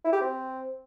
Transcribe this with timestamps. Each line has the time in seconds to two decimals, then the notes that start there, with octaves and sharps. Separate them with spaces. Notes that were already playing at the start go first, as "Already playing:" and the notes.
0.05 E4
0.13 G4
0.21 C4